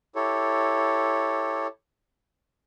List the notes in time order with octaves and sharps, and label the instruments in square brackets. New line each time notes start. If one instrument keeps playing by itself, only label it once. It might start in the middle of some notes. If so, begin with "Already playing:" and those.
[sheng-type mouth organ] E4 G4 A4 C#5